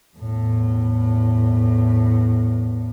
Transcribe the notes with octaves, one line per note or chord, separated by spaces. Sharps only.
E2 A2